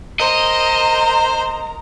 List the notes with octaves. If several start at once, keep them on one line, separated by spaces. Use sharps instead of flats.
A#4 C5 D#5 A#5